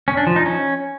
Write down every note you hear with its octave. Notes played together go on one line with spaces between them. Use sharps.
C#4
D4
F3
D#4
C#4